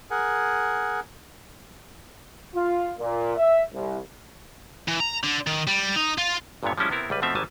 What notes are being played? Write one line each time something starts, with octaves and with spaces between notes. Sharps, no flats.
G#4 A#4 F#5 G#5
F4
A#2
E5
C2
E3
A#5
D3
D#3
G3
D#4
F4
G1 G2 A#2 D3 B3 C#5
F3 G3 G#3 C#4 E4
C3 B3 C4 E4 A#4
C#2 G3 B4
B2 F3 A3 C4 E5 A#5
G#1 F#3 G3 G#5 A5